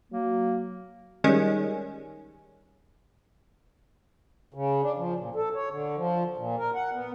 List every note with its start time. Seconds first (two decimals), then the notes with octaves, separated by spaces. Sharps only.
0.12 F#3 A#3
1.24 D#3 G3 G#3 C#4
4.54 C#3
4.83 D4
4.97 F3
5.20 A#2
5.36 A4
5.55 C#5
5.70 D3
5.97 F3
6.37 A#2
6.59 A#4
6.75 F#5
6.94 B3